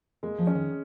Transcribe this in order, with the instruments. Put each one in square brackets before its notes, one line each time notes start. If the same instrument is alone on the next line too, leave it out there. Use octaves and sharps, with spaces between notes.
[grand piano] G#3 [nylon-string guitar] A#3
[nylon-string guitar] F3
[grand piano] C#4
[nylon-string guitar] D#3